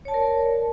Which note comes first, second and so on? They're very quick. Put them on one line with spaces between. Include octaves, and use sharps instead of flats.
C#5 A5 D5 A#4